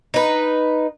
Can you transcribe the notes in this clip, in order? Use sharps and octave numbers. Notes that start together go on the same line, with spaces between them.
D#4 B4